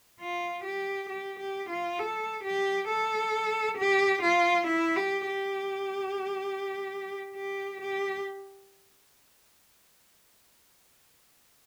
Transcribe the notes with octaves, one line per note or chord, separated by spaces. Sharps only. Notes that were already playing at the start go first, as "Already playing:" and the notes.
F4
G4
G4
G4
F4
A4
G4
A4
G4
F4
E4
G4
G4
G4
G4